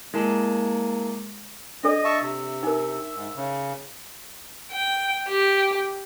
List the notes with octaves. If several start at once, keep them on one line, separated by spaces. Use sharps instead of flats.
G#3 A#3 E4 A#4 A5
D4 A4 D5 D#5
E5 A5 C#6
C3 E5
D#4 A#4
G#2
C#3
G5
G4